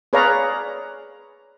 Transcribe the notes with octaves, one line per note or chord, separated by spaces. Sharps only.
G#4 B4 C#5 D5 F5 A#5